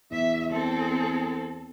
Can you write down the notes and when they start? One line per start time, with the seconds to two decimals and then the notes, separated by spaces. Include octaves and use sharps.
0.11 E2 E5
0.52 C4 A4